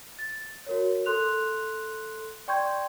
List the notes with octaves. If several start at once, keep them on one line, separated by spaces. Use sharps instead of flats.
A6
F#4 A#4 C#5
A4 C6 F#6 F7
D5 G5 C6 C#6 G6 G#6